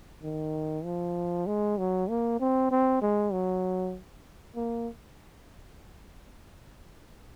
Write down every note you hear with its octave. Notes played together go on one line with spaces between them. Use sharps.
D#3
F3
G#3
F#3
A#3
C4
C4
G#3
F#3
A#3